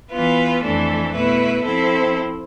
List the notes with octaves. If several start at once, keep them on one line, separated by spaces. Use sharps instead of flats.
E3 B3 F4 B4
F2 E3 A3 D4 A4
B2 A3 E4 B4
F3 C4 E4 A4 C5